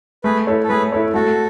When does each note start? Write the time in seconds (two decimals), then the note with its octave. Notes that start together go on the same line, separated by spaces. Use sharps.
0.24 A3 G#4 B4
0.47 E4 A4 C#5
0.63 A4
0.69 A3 G#4 B4
0.92 E4 A4 C#5
1.14 A3 F#4 A4